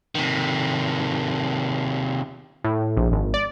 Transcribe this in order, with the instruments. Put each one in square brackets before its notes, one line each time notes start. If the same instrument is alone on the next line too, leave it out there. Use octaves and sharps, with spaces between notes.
[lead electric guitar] C3 D#3
[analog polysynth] A2
A#1
G#1
D5